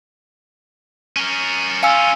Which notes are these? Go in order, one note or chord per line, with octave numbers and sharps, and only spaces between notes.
C#4 A#4
C#4 F4 F5 G#5 E6